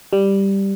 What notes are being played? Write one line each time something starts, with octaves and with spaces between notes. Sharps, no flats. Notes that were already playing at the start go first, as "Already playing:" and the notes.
G3